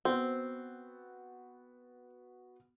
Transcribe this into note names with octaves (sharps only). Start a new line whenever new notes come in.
B3 C4 F#4